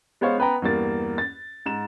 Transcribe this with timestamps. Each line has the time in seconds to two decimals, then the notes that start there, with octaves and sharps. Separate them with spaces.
0.21 G#3 B3 C5 C#5 F5
0.38 B3 B4 G5 A#5
0.62 E2 G2 A#3 A6
1.18 A6
1.66 G#2 E7